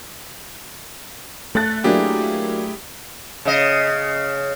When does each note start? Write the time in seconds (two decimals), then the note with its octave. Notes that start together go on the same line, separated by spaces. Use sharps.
1.55 A3 A4 F#6 A6
1.84 F#3 A#3 D4 E4 G4 G#4
3.45 C#3 D#5